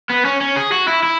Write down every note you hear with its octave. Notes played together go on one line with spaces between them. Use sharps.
B3
C#4
C#4
G#4
F#4
E4
E4